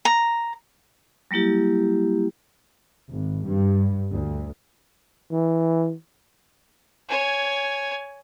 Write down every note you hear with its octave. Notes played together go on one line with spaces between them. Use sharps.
A#5
F#3 G3 A#3 E4 G4
G#1
G2
D2
E3
C#5 G#5